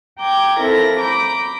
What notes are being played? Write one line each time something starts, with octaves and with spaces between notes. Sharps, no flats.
G5 A#5 D6 G6 G#6
F2 E4 A4 A#4 A#6
A#5 B5 D6 G6